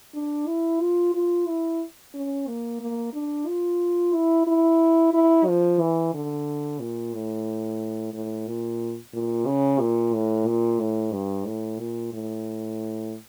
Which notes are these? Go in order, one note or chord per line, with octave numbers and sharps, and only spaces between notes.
D4
E4
F4
F4
E4
C#4
A#3
A#3
D4
F4
E4
E4
E4
F3
E3
D3
A#2
A2
A2
A#2
A#2
C#3
A#2
A2
A#2
A2
G2
A2
A#2
A2